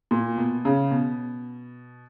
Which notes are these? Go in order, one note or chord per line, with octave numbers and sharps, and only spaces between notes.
A#2
B2
C#3
B2